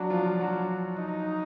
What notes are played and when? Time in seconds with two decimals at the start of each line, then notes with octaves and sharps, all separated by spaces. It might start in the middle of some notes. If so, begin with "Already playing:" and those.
Already playing: F#3 D4 F#4
0.10 F3 F4
0.39 F#3 F#4
0.98 D#4